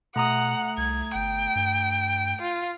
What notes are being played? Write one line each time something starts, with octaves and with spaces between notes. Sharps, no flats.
B2 A3 F#5 A#5 D#6
C2 G#6
G1 G5
G2
F4